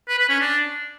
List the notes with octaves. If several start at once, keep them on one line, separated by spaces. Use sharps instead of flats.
B4
B4
C#4
D4